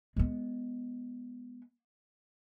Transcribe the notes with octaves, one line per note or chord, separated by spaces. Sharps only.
G#3 B3